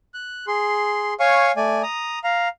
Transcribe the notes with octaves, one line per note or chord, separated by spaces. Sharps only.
F#6
G#4 C6
C#5 F5 G#5 C#6
A3 D5 G#5
A#5 D#6
F5 A#5